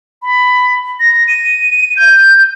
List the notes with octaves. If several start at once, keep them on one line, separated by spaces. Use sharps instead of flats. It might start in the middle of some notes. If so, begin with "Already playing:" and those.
B5
A#6
D#7
G6